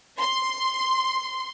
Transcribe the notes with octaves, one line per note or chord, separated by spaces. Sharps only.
C6